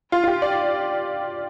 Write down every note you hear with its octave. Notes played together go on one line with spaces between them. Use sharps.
F4
F4
G4
D5